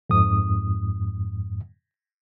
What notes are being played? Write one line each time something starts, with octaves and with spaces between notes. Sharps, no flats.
F2 G#2 D#6